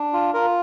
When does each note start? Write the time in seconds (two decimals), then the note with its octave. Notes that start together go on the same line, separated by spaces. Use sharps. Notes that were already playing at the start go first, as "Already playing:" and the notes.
Already playing: D4
0.13 F4
0.34 F4 A#4